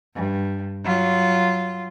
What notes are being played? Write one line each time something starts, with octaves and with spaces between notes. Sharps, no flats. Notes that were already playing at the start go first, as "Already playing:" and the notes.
G2
F#3 F4